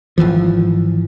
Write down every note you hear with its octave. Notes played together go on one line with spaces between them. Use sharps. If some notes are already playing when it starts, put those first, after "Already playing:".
G#1 D#2 E3 F3